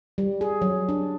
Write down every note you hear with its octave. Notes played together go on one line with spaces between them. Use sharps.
G3
G#4
F#3
D4